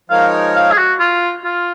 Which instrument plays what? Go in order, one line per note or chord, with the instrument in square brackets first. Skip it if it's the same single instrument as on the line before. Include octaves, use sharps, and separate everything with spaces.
[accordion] F3 G#3 D#4 A#4 C#5 [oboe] F5
[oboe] F5
G#4
F#4
F4
F4